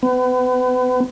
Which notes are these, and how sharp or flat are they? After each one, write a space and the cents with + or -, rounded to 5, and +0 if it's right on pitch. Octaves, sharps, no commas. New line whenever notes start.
B3 +35